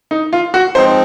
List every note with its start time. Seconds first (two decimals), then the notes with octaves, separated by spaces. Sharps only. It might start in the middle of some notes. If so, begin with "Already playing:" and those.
0.11 D#4
0.33 F4
0.54 F#4
0.75 F3 G#3 C4 D#4 C5